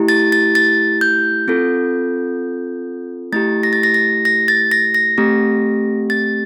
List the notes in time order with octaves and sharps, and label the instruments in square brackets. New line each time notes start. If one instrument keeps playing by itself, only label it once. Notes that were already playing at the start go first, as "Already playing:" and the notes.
Already playing: [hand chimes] A3 E4 G4
A6
A6
A6
G6
C4 F4 A4
A3 E4 G4 A6
A#6
A6
A#6
A#6
A#6
A6
A#6
A#6
A3 C4 G4
A6